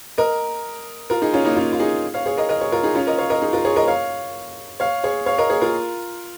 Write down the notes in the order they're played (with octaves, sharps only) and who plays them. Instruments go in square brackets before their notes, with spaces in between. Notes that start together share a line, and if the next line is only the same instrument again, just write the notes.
[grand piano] A#4 D#5
F4 A#4
D#4 G#4
C#4 F4
A#3 D#4
C#4 F4
F4
D#4 G#4
C#5 F5
G#4 C#5
A#4 D#5
A#4 D#5
G#4 C#5
F4 A#4
D#4 G#4
C#4 F4
A#4 D#5
C#5 F5
A#4 D#5
D#4 G#4
F4 A#4
G#4 C#5
A#4 D#5
C#5 F5
C#5 F5
G#4 C#5
C#5 F5
A#4 D#5
G#4 C#5
F4 A#4